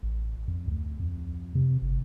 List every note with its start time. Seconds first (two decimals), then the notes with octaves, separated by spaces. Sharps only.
0.03 A1
0.48 F2
0.68 D2
1.00 F2
1.55 C3
1.82 G1